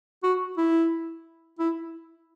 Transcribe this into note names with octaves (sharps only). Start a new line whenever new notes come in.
F#4
E4
E4